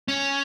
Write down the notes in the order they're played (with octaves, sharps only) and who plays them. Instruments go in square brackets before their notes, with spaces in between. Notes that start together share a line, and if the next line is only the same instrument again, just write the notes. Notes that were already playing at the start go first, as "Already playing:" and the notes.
[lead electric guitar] C#4